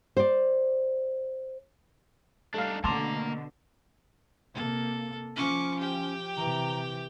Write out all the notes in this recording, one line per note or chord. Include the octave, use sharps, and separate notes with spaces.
C5 D5
G3 A3 D4 D#4 F5
B2 D3 A3 A#3 A5 A#5 C6 D6
C3 A#3 A4
F3 C#4 C#6 D6
G4 G5
C3 E3 A#5